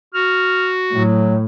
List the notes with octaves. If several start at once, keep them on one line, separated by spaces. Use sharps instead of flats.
F#4 F6
A2 F#3